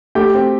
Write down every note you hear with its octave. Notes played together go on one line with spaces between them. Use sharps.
A3 G4 G5
C4